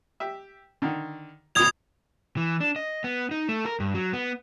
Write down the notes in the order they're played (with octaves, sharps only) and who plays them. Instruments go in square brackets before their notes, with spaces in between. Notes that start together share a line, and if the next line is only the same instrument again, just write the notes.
[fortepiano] G4 E5
D3 D#3
[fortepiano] D2 B2 [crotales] D#6 G#6 F7
[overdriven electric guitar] E3
D4
D#5
B3
D#4
A3
A#4
G2
F#3
B3